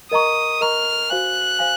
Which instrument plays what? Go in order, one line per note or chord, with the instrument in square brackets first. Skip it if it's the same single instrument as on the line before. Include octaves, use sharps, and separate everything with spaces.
[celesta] A#4 D#5 A#5 C#6 [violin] D#6
[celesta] A#4 D#5 A#5 C#6 [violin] F6
[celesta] F#4 C5 F5 G#5 [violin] F#6
[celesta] C5 F5 G#5